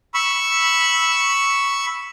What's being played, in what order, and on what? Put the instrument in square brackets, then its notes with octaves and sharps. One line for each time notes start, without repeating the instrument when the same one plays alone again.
[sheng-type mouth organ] B5 C#6 E6